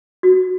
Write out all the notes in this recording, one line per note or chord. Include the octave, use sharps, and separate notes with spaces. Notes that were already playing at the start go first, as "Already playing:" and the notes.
F#4